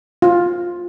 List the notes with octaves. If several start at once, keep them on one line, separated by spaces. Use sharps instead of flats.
F4